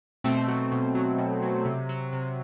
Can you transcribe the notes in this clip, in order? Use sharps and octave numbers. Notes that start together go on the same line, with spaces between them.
B2 A3 C4
F#3
B2
F#3
B2
F#3
C3
F#3
C3